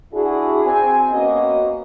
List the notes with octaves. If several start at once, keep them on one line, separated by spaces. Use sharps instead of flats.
D4 E4 F#4 G#4
C4 G#5
A#3 B3 C#4 F#4 D#5